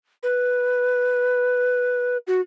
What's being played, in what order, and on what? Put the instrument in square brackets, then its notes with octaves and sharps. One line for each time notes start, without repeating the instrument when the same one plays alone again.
[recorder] B4
F#4